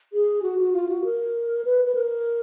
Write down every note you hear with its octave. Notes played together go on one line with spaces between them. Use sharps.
G#4
F#4
F#4
F4
F#4
A#4
B4
B4
A#4